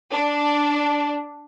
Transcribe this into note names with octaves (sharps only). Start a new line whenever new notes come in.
D4